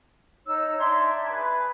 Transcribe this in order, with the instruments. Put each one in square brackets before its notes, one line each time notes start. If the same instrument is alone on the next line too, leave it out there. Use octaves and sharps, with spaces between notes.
[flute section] D#4 C#5 E6
[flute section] D4 E5 G#6 [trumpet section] D#4 A#5 C6
[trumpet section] G#4 B4